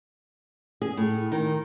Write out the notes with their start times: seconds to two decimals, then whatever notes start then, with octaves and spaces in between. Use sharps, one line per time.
0.82 G#4
0.97 A2
1.32 D#3